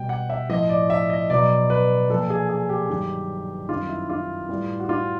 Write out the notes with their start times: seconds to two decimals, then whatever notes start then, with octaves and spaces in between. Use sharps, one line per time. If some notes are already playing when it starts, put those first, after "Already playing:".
Already playing: B2 G3 G5
0.09 F#5
0.30 E5
0.49 A2 F3 D#5
0.69 D5
0.90 E5
1.10 D#5
1.30 B2 F#3 D5
1.70 B4
2.10 A#2 F3 A4
2.30 G#4
2.49 G#4
2.69 G4
2.89 G2 D#3 F#3
3.69 F#2 D#3 G3 F4
3.89 E4
4.09 F4
4.49 A2 E3 G3
4.80 F#4
4.89 F4